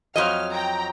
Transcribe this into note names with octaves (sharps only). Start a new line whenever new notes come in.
F2 F#3 D#5 F6
G5 A#5